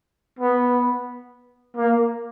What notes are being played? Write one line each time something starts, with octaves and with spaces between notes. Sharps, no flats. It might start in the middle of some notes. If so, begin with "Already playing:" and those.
B3
A#3